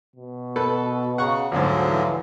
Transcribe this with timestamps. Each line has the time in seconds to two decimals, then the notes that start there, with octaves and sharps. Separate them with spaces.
0.16 B2
0.56 A4 B4
1.18 C#3 F#5 A#5 C#6
1.52 D2 G#2 D3 F3 F#3
1.88 E3